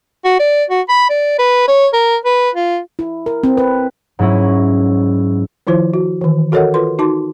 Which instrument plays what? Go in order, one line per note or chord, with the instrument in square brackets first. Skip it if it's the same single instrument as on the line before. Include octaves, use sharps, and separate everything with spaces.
[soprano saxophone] F#4
D5
F#4
B5
D5
B4
C#5
A#4
B4
F4
[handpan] E4
A#4
C4
B4
[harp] G#2 F#3 C#4 E4 A#6
[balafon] D#3 F3 E4 F4 C5
F#4
D#3 E3
F#4 A4 A#4 C#5 D#5 F#5
F4 A4 B4 C6
D#4 F#4 A5 C6 D6